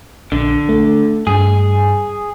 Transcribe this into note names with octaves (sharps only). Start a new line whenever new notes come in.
A#1 D3
A3
G2 G#4